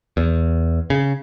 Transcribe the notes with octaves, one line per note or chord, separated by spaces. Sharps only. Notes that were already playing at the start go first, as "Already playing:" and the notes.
E2
C#3